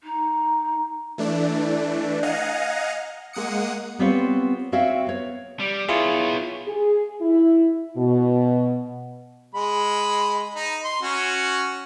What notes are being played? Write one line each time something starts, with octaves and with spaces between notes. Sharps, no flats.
D#4
E3 A3 D4
D#5 F5 F#5 G#5 A#5
G#3 A#3 F#5 D#6 C#7
G3 B3 C4 F4 B4 C#5
C4 F#4 C#5 E5 F5 G5
B3 C#5
G3
B3 E4 F4 G#4 C#5
G#4
E4
B2
G#3 B5
D#4
C6
C#4 F#4